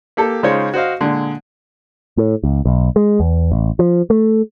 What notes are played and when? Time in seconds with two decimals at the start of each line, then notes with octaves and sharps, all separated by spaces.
0.17 A#3 G4 A4
0.43 C#3 G#3 D#4 F4 C5 C#5
0.74 F#4 C5 D#5 F5
1.00 A#2 D3 G#3
2.17 A2
2.43 C#2
2.65 B1
2.96 G#3
3.20 E2
3.52 A1
3.79 F3
4.10 A3